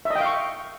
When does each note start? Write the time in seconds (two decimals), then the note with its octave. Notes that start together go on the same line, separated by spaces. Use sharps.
0.05 E5
0.10 D#5
0.15 G5
0.21 F5
0.26 C#6